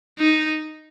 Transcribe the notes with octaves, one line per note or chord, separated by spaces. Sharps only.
D#4